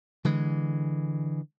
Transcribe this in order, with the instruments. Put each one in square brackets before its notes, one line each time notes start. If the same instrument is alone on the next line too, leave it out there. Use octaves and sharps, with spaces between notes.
[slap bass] D3 E3 G#3